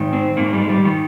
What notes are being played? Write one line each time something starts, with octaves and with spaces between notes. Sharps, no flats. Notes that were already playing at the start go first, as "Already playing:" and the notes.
Already playing: G#2 D#3
C4
G#2 D#3 A#3
G3
G#3
G3
D#3